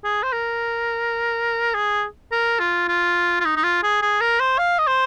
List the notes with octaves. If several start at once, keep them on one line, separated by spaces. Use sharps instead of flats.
G#4
C5
A#4
G#4
A#4
F4
F4
F4
D#4
D#4
F4
G#4
G#4
A#4
C5
F5
D#5
C5